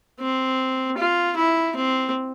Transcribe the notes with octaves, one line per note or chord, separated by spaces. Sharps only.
C4
F4
E4
C4